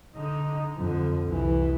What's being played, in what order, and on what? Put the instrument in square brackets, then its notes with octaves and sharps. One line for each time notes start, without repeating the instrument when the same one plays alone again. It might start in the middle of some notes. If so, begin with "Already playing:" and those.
[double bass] D3 D#4
F2 D3
C2 E3